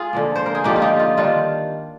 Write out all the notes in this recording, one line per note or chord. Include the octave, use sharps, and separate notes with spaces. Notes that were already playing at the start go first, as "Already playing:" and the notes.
Already playing: F4 G#4
D3 F3 A#3
C5
A#4
G#4
D3 F3 A#3 D#4 G4
F4
D#4 G4
F4
D#3 G3 D4 F4